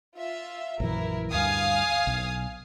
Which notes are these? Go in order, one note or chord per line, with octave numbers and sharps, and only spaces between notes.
F4 E5
A#1 F#2 E3 E4 A#4
D2 G2 F5 G#5 D#6
B1